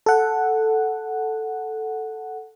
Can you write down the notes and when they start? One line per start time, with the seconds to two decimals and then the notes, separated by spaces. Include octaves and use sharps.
0.06 A4 F#5